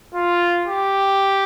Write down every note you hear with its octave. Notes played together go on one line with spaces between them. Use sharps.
F4
G4